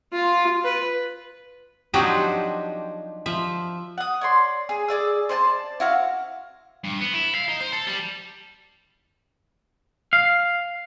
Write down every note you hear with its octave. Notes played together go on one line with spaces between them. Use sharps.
F4
B4
F3 F#3 C4 D4 D#4 G4
F3 E5
F#5 D#6
C#5 D5 C6
G#4
G#4 D5 E6
C5 D5 G#5 A5
E4 F#4 F5
G2
B3
E4
F5
D#4
C5
A4
G3
F5